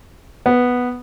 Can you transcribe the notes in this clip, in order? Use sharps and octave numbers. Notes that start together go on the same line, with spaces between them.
B3